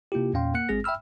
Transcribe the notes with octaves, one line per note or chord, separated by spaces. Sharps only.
C3 A#3 E4 F4 G4
E2 A#2 C#4 F5 G5 C6
A#3 F#5 F#6 C#7
G#1 G#3 C4 G#4 A#6
E5 G5 B5 E6 F6